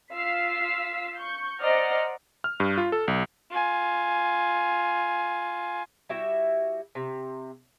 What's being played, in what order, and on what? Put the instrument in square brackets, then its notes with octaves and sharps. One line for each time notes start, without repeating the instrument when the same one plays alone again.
[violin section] F4 F5 E6 B6 C7
C#6 G6
C5 D5 D#5 F#5 A#5 F6
[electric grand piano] F6
G2
F4
A4
B1
[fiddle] F4 G#5
[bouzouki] G3 E4 F#4 E5
C3